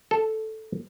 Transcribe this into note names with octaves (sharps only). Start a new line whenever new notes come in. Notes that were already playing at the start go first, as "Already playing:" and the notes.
A4